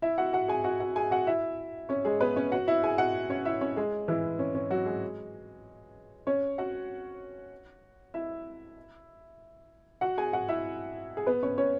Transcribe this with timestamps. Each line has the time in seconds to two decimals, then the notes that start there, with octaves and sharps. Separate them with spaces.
0.02 E4 E5
0.18 F#4 F#5
0.33 F#4 F#5
0.48 G#4 G#5
0.64 F#4 F#5
0.80 F#4 F#5
0.96 G#4 G#5
1.11 F#4 F#5
1.27 E4 E5
1.89 C#4 C#5
2.05 G#3 G#4
2.20 B3 B4
2.36 C#4 C#5
2.52 F#4 F#5
2.67 E4 E5
2.83 G#4 G#5
2.98 F#4 F#5
3.30 C#4 C#5
3.45 E4 E5
3.61 C#4 C#5
3.76 G#3 G#4
4.08 E3 E4
4.39 C#4
4.55 C#4
4.70 F#3 F#4
4.86 G#3 G#4
6.27 C#4 C#5
6.58 F#4 F#5
8.14 E4 E5
10.01 F#4 F#5
10.18 G#4 G#5
10.33 F#4 F#5
10.49 E4 E5
11.17 G#4
11.26 B3 B4
11.43 C#4 C#5
11.58 C#4 C#5